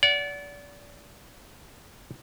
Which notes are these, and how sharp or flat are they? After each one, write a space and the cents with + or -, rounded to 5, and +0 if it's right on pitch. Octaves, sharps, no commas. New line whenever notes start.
D5 -30 F#5 +0